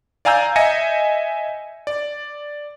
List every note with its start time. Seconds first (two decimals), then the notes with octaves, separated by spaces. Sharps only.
0.25 D5 F5 G#5 A#5 E6 G6
0.56 D#5 E5 G#5 A#6 C#7
1.87 D5